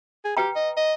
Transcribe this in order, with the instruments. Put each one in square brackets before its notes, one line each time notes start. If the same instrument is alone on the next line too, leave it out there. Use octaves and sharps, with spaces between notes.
[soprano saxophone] G#4
[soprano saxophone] G4 [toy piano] B4 G5 A#5
[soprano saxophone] D#5
D#5